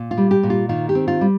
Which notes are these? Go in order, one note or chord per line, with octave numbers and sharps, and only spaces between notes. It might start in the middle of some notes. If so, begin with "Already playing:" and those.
Already playing: A#2
F4
G3
G4
A#2
F4
D#3 F4
G4
C4
F4
G3